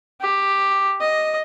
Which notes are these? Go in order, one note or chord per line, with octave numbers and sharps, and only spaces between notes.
G4
D#5